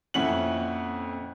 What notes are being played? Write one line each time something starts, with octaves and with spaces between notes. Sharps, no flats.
F2 A#2 C#4 E4 F#5 F#7